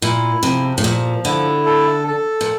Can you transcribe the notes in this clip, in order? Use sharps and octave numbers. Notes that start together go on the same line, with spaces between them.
A#2 E4
C3 F3
A2
A#2 F3
D3 E4
A4
A4
A#2